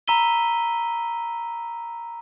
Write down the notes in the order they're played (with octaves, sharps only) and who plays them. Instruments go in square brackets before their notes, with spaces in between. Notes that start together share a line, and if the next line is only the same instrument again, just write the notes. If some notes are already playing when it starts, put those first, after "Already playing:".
[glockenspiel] A#5 B5 E6 B6 D#7 G7